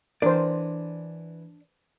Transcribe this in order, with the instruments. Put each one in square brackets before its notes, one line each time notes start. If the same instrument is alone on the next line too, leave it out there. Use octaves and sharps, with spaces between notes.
[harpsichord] E3 [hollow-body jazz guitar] D4 D5 [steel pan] A#4 C5